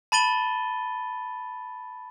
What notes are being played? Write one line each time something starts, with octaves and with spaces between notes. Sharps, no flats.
A5 B5 A6 D#7 G7